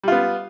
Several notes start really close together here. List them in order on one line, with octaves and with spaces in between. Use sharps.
G3 F4 B3